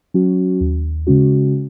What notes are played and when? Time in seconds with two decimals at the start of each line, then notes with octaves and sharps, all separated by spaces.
0.14 F#3 C#4 F#4
0.60 D#2
1.07 C#3 G#3 C#4 F#4